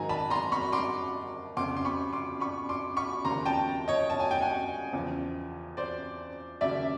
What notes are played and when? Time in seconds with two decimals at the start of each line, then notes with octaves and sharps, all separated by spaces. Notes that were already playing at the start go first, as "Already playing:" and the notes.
Already playing: G#2 D#3 F#3 G#5 A#5
0.09 A5 B5
0.30 A#5 C6
0.52 B5 C#6
0.72 C6 D6
1.57 F2 C#3 F3 C6 D6
1.77 C6
1.85 B5 C#6
2.13 C6 D6
2.40 B5 C#6
2.69 C6 D6
2.96 B5 C#6
3.25 D#2 C#3 F3 A#5 C6
3.46 G5 A5
3.88 C#5 D#5
4.10 A5
4.20 G#5
4.31 G5
4.41 F#5 G#5
4.93 E2 C#3 F3
5.77 C5 D5
6.61 D#2 C#3 F#3 D5 E5